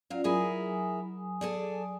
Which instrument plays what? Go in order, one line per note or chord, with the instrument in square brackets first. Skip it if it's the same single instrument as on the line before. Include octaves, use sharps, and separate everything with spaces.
[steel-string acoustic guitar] F#3 F5 [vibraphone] C#4 F4 D5
[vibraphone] F#3 G#5 D#6 [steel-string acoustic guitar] E4 G#4 A#4
[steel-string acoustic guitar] G#4 A4 D5